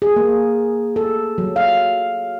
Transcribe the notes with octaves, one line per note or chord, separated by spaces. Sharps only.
G#4
A#3
A4
F#3
F5